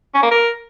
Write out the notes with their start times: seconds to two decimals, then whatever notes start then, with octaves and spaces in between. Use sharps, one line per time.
0.15 C#4
0.23 A#3
0.31 A#4